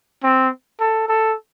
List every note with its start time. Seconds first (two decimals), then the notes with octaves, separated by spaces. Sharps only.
0.23 C4
0.80 A4
1.08 A4